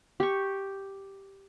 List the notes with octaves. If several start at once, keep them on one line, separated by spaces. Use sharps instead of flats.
G4 C#6